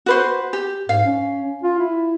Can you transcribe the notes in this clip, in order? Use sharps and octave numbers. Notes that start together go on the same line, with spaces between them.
F#4 B4 C5
G4
G#2 F5
C#4
F4
E4